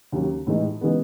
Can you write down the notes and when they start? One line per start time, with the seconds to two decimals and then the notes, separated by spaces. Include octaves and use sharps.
0.12 D#2 C#3 F#3
0.47 A2 E3 G#3 D#4
0.81 C#3 E3 G#3 B3